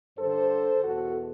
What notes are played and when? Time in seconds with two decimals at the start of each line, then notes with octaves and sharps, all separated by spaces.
0.18 G2 D3 A4 C5
0.83 E2 B2 F#4 A4